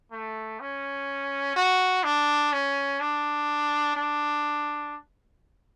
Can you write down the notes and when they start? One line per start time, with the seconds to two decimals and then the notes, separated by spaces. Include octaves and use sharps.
0.12 A3
0.60 C#4
1.56 F#4
2.04 D4
2.52 C#4
3.00 D4
3.96 D4